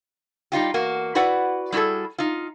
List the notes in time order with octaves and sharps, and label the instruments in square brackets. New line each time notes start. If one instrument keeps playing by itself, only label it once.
[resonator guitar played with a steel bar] G3 D#4 F4 G4
E2 A#3 F#4
E4 F#4 B4 D5 F#5
G3 E4 F#4 G#4 A4
D#4 F4